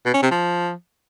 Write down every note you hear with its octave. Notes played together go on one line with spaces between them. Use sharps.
B2
C#4
C3
F3